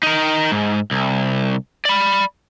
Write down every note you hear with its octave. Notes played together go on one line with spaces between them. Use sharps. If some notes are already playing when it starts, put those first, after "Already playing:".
D#4 A#4
G#2
C2
D5 B5